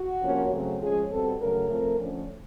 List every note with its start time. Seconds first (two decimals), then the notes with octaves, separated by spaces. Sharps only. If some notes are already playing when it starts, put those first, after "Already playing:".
Already playing: F#4
0.21 C3 F3 A#3 C#4
0.52 C#3 F#3 A3 C4
0.81 F3 G#3 C#4 G#4
1.11 B2 G3 C4 A4
1.40 C#3 F#3 A3 A#4
1.70 F3 A3 C4
2.00 D3 F3 A3 C#4